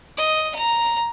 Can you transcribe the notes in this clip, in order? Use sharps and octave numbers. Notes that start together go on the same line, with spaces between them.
D#5
A#5